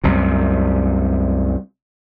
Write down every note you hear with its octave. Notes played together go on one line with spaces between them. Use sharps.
C2 F#2 C3